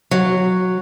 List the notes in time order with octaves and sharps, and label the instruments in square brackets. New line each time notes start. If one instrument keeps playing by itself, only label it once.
[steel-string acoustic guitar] F#3